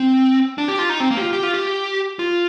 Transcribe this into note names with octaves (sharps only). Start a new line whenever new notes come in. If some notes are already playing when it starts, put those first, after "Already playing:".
Already playing: C4
D4
G4
F4
D#4
C4
A#3
G4
F4
G4
F4
G4
F4